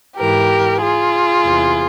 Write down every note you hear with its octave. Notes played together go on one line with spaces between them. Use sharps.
G#2 E3 G4 A#4
F4 G#4
E2 C3 E3